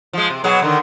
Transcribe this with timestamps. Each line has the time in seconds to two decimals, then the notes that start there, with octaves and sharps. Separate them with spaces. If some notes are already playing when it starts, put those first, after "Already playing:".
0.13 F3 G#3
0.30 C3
0.44 B2 F#3 G#4
0.62 D3 D#3